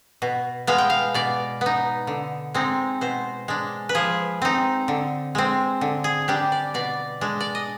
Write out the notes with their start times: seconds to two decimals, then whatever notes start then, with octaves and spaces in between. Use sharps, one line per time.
0.22 B2
0.67 G#3 B3 F5
0.78 G5
0.90 F5
1.14 B2 D5
1.61 B3 D#4
2.07 D3
2.54 G#3 C4 D#4
3.01 B2 C5
3.48 G#3 D4
3.89 B4
3.95 F3 G#4
4.42 C4 D#4
4.88 D3
5.35 G#3 C4
5.81 D3
6.04 G#4
6.28 G3 D4 G4
6.52 D5
6.74 B2 D5
7.21 G#3 D4
7.40 D5
7.55 D#5